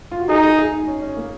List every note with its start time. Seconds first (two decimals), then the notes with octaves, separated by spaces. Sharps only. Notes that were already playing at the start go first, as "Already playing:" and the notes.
0.11 F4
0.20 F#4
0.29 D#4 G#4
0.43 G#4
0.58 G#4
0.72 D#4
0.87 C#4
1.02 C#4
1.17 A#3